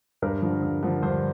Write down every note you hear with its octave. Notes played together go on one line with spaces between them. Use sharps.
G2 A#4
D3 F3
G2
D3 F3
G2 C5